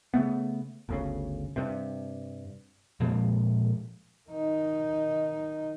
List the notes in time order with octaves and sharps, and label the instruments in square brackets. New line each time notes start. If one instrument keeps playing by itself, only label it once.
[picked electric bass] C#3 A3 B3
G1 D2 C#3
G2 C3
[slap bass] A#2 F3 G#3 A#3
[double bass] D#3 D#4